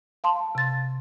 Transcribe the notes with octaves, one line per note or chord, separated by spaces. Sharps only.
F5 A5 C6
C3 A6